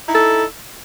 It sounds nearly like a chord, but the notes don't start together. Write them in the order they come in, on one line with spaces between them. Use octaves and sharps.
E4 D#4 A4